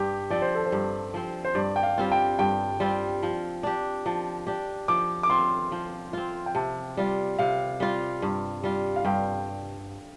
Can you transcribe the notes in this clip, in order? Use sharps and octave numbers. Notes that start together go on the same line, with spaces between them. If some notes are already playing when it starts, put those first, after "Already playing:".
Already playing: G2 G4
F3 C4 D5
C5
A4
C5
G2
F3 C4
C5
G2 D5
G5
F5
G3 C4 F4
G5
G2 G5
G3 C4 F4
F3
D4 G4
F3 A5
D4 G4
F3 D6
D6
C4 F4 C6
F3
C4 F4
G5
C3 A5
G3 F4
C3 F5
G3 F4
G2
G3 F4
F5
G2 G5